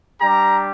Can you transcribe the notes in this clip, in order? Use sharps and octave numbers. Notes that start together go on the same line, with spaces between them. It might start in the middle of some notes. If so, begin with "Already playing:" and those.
G3 D4 G4 A#5